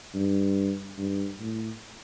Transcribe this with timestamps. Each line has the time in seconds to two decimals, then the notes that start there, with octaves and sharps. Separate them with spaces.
0.15 G2
0.98 G2
1.40 A2